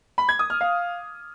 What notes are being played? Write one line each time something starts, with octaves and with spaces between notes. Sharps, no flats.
B5
G#6
D#6
F6
F5